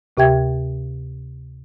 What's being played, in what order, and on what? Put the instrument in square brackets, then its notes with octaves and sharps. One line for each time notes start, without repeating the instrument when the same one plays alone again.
[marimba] D2 C3 G4 E5 G5 G#6